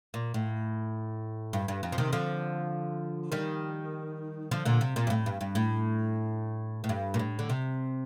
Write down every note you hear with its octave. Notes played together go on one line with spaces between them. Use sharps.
A#2
A2
G2
G2
F2
F3
C3 D#3
D3 F3
D#3 G3
D3 F3
A#2 D3
C3
A#2
G2
A2
G2
G2
A2
A2
G2
A#2
A2
D3
C3